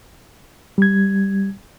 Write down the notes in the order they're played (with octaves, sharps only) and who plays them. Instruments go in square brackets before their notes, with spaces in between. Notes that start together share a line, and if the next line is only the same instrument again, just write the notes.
[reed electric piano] G3 G#6